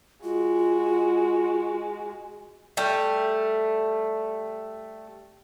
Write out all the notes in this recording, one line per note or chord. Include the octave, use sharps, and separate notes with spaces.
G#3 F4 F#4
G3 A3